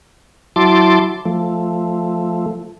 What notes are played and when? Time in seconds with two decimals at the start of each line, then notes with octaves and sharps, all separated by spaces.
0.56 F#3 E4 A5 C6 D6
1.25 F3 A3